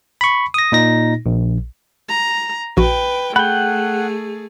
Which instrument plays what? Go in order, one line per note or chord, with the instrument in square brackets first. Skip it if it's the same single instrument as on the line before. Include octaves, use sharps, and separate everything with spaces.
[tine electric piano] B5 C#6
D#6 A#6
A#2 D#4 A#6
A#1
[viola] A#5
[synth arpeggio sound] A#1 F#4 [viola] B4 G5
[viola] A3 G#4 [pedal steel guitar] F#5 G5 [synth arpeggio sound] B5